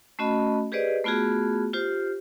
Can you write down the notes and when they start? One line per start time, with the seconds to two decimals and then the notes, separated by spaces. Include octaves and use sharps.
0.19 A3 C#4 F#4 D#5 B5
0.72 G4 G#4 B4 C5 D5 D#5
1.04 A3 B3 F4 F#4 G#4
1.73 F4 G4 C5